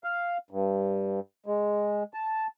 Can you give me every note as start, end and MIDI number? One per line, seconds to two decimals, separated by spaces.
0.04 0.37 77
0.51 1.20 43
1.46 2.03 56
2.14 2.47 81